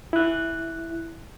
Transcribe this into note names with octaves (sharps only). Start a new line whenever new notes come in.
E4 F#6